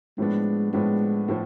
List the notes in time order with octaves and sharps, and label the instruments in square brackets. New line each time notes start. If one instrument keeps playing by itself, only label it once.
[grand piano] A2 F3 B3 D4 [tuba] G#3
[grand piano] A2 F3 B3 D4 [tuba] G#3
[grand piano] A2 F3